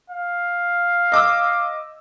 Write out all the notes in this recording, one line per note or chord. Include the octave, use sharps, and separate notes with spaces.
F5
D#5 D6 E6